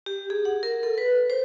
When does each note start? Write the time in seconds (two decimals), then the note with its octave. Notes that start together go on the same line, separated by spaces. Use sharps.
0.06 G4
0.30 G#4
0.45 F#5
0.63 A#4
0.83 A4
0.98 B4
1.30 C5